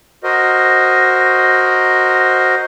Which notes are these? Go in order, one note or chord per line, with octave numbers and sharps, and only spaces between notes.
F#4 A#4 C5 D#5